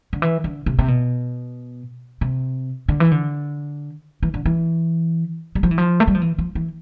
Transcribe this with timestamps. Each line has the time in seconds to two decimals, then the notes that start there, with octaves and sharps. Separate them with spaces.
0.13 D3
0.22 E3
0.44 D3
0.66 C3
0.79 C3
0.88 B2
2.21 C3
2.89 D3
3.00 E3
3.11 D3
4.23 E3
4.34 D3
4.46 E3
5.55 G3
5.63 F3
5.71 E3
5.78 F3
6.00 A3
6.08 G3
6.15 F3
6.22 E3
6.38 F3
6.55 E3